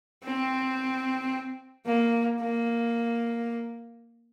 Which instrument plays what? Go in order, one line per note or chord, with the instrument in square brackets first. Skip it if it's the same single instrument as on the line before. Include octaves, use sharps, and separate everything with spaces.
[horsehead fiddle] C4
A#3
A#3